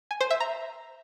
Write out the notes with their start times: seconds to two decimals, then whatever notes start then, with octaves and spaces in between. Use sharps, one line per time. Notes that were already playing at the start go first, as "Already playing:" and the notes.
0.11 G#5
0.21 C5
0.31 E5
0.40 A#5